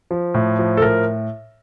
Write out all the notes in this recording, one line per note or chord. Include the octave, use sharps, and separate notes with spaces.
F3
A2
F3
A4
A2 A#4